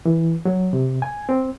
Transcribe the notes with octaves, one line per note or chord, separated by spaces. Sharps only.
E3
F#3
C3
G#5
C4